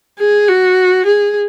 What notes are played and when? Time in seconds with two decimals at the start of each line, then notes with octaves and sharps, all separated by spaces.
0.19 G#4
0.48 F#4
1.06 G#4